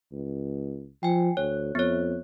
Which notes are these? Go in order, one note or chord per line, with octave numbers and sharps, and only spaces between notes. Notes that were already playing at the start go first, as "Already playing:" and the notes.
C#2
F3 G5 G#5
D2 C#5
F2 B3 C#5